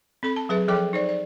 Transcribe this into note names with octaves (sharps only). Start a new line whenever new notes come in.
C4 A4 B5
A5
F#3 G#4 B4 E5
F3 G#4 A4 C#5 G5 D6
D#4 C5 D5
D5